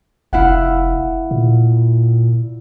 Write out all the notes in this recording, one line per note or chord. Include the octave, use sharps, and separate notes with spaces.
F1 E4 F5 F#5
A#2